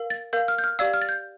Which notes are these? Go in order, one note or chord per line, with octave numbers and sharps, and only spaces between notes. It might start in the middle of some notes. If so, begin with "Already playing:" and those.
Already playing: A#4 F5
A6
A#4 F5 G6
F6
G6
F6
G4 D5 F5 E6
F6
A6
G6